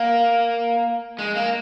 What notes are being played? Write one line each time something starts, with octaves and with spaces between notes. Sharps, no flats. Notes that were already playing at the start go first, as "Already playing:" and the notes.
Already playing: A#3
G#3
A#3